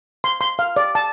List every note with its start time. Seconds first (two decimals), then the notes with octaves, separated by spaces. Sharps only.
0.24 C6
0.41 C6
0.59 F5
0.76 D5
0.95 A5